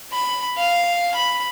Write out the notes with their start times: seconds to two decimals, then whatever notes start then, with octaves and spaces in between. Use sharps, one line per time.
0.13 B5
0.58 F5
1.15 B5